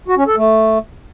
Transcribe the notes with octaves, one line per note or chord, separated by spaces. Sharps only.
F#4
C#4
A4
A3